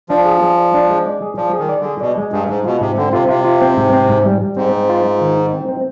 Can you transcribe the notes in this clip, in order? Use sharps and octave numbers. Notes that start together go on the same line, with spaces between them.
F3 D4
G#4
G#4
D5
D4
G#3
D5
G#4
F3 D5
G#4
D#3
D5
D3
G#4
B2 D5
G#3
G2 G#4
G#2 G#3
B2 F4
G#2 C3
D3 C4
C3 F4
C3 F4
F4
C4
G#2
C4
G#2
G3
G3
G#2 C4
C4
F4
F4
D#3
D#4
C4
C4